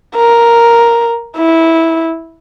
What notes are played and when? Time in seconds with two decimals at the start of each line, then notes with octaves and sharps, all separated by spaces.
0.16 A#4
1.37 E4